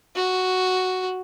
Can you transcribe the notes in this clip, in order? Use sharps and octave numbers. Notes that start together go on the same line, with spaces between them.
F#4